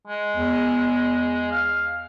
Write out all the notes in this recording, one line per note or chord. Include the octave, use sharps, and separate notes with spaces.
G#3
E2
F5